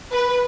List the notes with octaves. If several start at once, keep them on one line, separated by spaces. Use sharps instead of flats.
B4